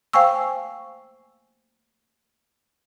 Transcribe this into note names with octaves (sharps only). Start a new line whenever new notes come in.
C5 F5 G5 G#5 C#6 E6